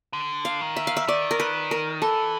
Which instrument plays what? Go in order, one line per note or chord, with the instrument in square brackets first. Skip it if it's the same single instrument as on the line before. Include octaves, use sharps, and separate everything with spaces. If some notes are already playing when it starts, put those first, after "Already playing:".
[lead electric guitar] D3
[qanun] F5
[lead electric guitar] D#3
[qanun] E5
F5
E5
[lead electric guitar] D#3 [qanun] D5
[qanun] A#4
B4
A#4
[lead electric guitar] E3 [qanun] A4